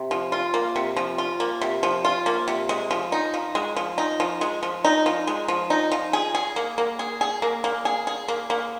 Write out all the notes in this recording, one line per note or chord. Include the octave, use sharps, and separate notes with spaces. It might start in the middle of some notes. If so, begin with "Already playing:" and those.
Already playing: C3
F3
F4
A#3
C3
F3
F4
A#3
C3
F3
F4
A#3
C3
G#3
F3
D#4
F3
G#3
F3
D#4
F3
G#3
F3
D#4
F3
G#3
F3
D#4
F3
G#4
G#4
A#3
A#3
G#4
G#4
A#3
A#3
G#4
G#4
A#3
A#3